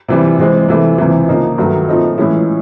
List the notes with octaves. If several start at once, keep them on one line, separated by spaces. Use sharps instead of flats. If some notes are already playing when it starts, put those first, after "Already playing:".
C3 E3 G3
C3 E3 G#3 C4
C3 E3 A3
C#2 C3 E3
C#3 F3 A#3 D#4
G2 D#3 F#3 A3
A#2 F3 A3 C4 D#4
A2 E3 G#3 C#4 E4